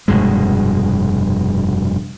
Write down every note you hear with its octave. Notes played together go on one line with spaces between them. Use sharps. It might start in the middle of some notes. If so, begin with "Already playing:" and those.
F1 G2 B2 G#3